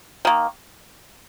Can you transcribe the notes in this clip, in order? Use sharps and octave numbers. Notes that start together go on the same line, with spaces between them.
D#3 A#3